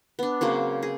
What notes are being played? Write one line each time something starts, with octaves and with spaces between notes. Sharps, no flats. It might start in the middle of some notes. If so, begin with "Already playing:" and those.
B3 D4
C#3 F#3 A#3 C4
G#4